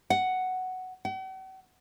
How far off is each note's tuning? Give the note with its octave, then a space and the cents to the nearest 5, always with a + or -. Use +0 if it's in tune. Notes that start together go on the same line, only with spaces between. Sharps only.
F#5 +5
F#5 +45